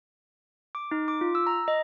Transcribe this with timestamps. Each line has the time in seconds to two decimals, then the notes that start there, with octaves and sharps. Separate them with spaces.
0.75 D6
0.91 D#4
1.08 D6
1.21 F4
1.35 E6
1.47 A#5
1.68 D#5